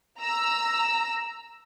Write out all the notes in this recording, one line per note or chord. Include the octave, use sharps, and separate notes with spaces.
A#5 E6